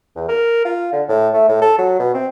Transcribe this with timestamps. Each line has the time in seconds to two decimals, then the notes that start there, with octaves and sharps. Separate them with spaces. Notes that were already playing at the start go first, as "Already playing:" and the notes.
0.16 E2
0.28 A#4
0.65 F4
0.92 D3
1.08 A2
1.33 A3
1.48 A2
1.62 A4
1.78 F#3
1.99 B2
2.14 C4